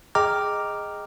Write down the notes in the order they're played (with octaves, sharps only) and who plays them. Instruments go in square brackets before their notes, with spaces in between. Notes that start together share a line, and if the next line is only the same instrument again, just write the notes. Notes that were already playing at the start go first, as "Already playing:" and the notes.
[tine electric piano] G#4 D#5 G5 A#5 D6 F6